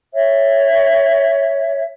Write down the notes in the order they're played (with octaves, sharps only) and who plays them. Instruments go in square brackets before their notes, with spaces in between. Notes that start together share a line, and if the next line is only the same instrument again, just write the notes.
[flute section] C#5 E5